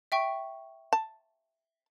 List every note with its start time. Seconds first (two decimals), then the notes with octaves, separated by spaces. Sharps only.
0.12 E5 G5 C#6
0.93 A5